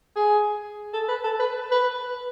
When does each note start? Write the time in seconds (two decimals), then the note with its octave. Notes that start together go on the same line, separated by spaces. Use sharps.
0.16 G#4
0.94 A4
1.09 B4
1.24 A4
1.40 B4
1.71 B4